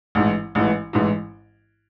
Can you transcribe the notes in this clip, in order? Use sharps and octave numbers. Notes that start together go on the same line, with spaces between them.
A1 G#2 E3
A1 G#2 E3
A1 G#2 E3